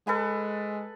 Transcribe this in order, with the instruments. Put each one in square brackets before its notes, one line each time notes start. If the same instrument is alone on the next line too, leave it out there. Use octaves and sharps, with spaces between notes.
[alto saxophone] G#3 [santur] A4 B4 G#5